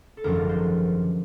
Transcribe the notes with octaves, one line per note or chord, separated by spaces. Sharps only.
A4
G#1 F#2 D3 F3 A#4
C5